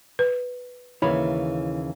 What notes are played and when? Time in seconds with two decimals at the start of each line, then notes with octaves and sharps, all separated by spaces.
0.19 B4
1.02 D#2 C#3 E3 E4 C#5 B5